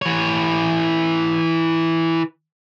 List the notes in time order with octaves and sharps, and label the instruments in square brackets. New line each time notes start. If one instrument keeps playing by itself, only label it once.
[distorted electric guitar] E3 C#5